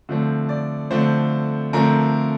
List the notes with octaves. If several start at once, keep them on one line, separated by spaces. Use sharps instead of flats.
D3 F3 A3 C4
D5
D3 F3 A3 C4 C5
D3 F3 A3 C4 A#4